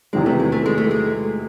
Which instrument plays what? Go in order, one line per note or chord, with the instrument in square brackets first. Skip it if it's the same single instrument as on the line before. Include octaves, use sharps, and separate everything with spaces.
[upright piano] E2 C3 D#3 F#3 [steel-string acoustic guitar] G#3
[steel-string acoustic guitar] A3
G#3
A3
G#3
A3
G#3